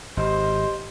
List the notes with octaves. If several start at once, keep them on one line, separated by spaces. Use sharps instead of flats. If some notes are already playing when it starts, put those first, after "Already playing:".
G#1 G4 C5 D#5